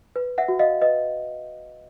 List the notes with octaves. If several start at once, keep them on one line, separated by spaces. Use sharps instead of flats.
B4
E5 F#5
F#4
D#5 F5
B4 D#5